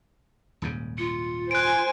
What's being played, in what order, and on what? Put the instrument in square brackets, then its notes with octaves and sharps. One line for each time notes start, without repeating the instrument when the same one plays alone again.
[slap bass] D#1 G#2 C#3
[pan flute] F4 [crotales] C#7
[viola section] C5 G#5 [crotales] F#6 D7